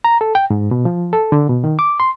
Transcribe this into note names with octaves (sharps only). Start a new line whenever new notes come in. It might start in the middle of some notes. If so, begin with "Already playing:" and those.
A#5
A4
G5
G#2
B2
F3
A4
D3
B2
D#3
D6
C6